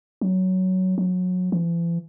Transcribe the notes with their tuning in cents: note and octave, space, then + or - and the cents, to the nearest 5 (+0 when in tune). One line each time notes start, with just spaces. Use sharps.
F#3 +10
F#3 -25
E3 +45